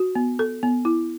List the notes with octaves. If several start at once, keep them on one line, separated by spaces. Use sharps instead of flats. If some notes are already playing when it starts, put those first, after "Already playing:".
Already playing: F#4
B3
A4
B3
E4